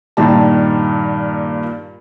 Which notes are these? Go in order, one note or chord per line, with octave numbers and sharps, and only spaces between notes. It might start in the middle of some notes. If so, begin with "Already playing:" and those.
G2 A#2 D#3 A5